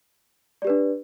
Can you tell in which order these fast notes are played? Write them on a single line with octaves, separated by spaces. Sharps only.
D5 G4 B4 D4